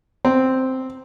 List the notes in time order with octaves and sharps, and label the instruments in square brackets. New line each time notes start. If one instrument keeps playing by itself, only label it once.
[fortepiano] C4